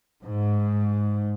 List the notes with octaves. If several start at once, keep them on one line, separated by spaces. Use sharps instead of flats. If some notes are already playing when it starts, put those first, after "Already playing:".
G#2